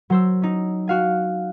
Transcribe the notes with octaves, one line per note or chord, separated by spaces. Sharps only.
F#3 C5 E6
C#4 D#4
F#4 F5 G#5